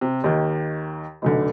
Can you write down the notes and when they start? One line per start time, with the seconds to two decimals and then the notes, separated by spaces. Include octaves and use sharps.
0.01 C3
0.24 D#2 D#3
1.22 F1 B1 D3